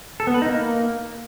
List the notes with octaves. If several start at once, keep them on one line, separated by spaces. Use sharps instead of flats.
A4
B3
B4
D#4
A#3